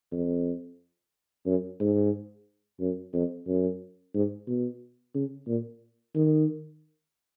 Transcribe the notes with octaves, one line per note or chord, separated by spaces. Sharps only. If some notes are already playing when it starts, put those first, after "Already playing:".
F2
F#2
G#2
F#2
F2
F#2
G#2
B2
C#3
A#2
D#3